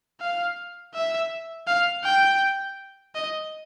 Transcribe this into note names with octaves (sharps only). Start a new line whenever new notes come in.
F5
E5
F5
G5
D#5